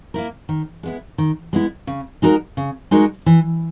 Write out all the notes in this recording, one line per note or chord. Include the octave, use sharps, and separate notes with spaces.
A#3 E4 A#4
D#3
G#3 B3 E4
D#3
G#3 B3 E4
C#3
G#3 D#4 F#4 A#4
C#3
G#3 D#4 F#4 A#4
E3